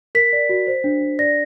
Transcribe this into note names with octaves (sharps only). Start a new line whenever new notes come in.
A#4 B6
D5
F#4
C5
D4
D4
D5 A#6